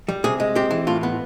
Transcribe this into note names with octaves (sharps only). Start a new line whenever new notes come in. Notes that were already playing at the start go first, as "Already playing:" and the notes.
G3
C3 G#4
G#3
C4 G4
E3
A2 F4
B3